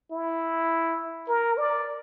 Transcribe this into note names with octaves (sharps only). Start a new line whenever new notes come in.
E4
A#4
D5